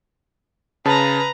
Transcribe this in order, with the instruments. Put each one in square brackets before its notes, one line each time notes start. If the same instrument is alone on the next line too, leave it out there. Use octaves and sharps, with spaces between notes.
[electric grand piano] C#3 A5 [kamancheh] B4 A#5